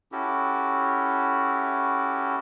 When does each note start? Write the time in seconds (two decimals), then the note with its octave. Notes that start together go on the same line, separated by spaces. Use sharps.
0.12 C#4 E4 F#4 G4 A4